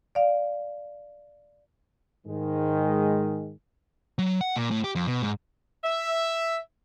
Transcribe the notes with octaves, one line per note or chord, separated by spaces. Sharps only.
D5 F5
G#2 D#3 G#3
F#3
F#5
A#2
A2
G4
F2
B2
G#2
E5